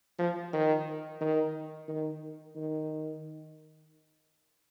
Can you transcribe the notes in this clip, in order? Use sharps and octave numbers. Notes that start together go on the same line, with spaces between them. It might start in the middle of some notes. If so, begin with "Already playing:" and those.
F3
D#3
D#3
D#3
D#3